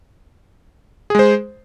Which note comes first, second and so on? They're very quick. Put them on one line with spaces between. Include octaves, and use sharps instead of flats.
G#4 G#3 C5